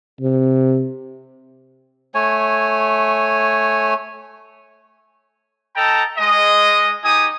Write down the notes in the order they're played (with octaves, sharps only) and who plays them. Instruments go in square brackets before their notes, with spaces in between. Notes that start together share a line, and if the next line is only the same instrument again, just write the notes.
[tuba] C3
[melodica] A3 C#5 G#5
[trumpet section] A4 D#5 G5 A5 A#5
G#3 D#5
D#4 G4 G#5 D#6